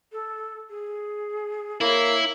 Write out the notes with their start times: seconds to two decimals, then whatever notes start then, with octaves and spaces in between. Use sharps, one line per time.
0.12 A4
0.70 G#4
1.81 A#3 E4 C#5